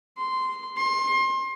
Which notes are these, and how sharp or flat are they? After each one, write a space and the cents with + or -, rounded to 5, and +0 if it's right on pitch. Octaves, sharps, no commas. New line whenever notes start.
C6 -10
C6 +30